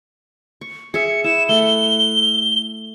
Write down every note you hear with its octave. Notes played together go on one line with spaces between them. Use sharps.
C#6
G#4 E5 C#7
E4 E7
A3 F#5 G7